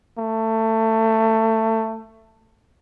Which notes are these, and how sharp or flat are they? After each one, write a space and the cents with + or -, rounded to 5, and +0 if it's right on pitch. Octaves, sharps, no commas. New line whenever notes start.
A3 +20